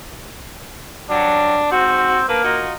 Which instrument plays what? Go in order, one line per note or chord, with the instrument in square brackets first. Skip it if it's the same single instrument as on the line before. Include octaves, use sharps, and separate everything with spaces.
[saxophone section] G2 F#3 [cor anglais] D4
[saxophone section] G#2 F#4 [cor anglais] C4
[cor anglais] A#3 [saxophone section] D4 A#4 B4
[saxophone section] D#4 F4 F#4